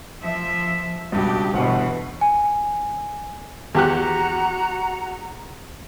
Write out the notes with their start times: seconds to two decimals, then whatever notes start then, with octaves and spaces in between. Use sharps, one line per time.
0.22 F3 E5
1.12 C#2 G2 B2 G4
1.54 G1 G2 B2 E3 F#5
2.21 G#5
3.75 E2 F#4 G4 F#5 A#5 F#6